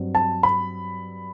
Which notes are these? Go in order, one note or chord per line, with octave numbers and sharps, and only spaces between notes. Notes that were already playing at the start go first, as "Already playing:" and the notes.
Already playing: G2 F#3 C4
A5
B5